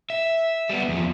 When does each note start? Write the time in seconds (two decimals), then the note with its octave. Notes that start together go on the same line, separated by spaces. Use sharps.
0.10 E5
0.69 G3 B3
0.89 E2 F3